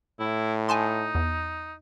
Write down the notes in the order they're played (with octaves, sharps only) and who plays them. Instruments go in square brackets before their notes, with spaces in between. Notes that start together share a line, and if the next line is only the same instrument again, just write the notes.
[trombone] A2 [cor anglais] E4
[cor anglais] D#4 [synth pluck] G#5 A5 C6
[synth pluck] E2